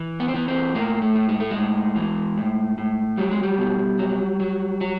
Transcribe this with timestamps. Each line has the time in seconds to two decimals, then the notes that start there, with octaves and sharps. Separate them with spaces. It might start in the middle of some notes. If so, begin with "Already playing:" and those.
Already playing: E3
0.20 B3
0.28 C4
0.34 E3 B3
0.48 C4
0.75 A2 A#3
1.02 A3
1.15 A2
1.29 G#3
1.40 A3
1.51 G#3
1.56 A2
1.96 E3
2.38 A2
2.78 A2
3.18 F#3 G3
3.31 G#3
3.43 G3
3.58 B2
3.99 F#3
4.40 F#3
4.81 F#3